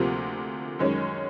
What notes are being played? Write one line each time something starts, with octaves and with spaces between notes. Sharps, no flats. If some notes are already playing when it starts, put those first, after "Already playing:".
Already playing: D2 C3 F3 A#3
F#2 D#3 G#3 C#4